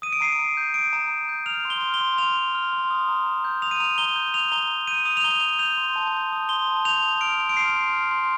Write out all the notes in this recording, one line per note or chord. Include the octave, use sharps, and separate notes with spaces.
D#6 D#7
D7
A#5 C7
D7
A#5
G6
D#6 D7
A#5
A#5
G6
F6 F7
C6
G7
F6
G7
C6
F6 F7
C6
F6
C6
D#6
A#5
A#5
G6
D#6 F7
D#7
A#5 F7
A#5 G7
G6
D#6 F7
A#5 G7
A#5
G6 D#7
D#6 F7
F7
A#5 G7
A#5 F7
G6 F7
C6
A5
G6
D#6
C6 G7
A5
G6 F7
D#6
F6 D7
C6
D7
F6 C7
C6
F6
C6